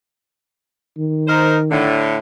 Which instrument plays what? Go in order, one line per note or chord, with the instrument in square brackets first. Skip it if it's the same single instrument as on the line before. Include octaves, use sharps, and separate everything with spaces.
[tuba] D#3
[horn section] D#4 A#4 C5
A2 D3